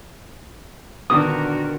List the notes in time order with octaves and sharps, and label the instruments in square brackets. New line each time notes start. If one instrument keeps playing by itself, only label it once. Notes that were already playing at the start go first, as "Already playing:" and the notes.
[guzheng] A#2 D3 D#3 [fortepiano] B3 D4 [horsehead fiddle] F#4 A#4 [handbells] D#6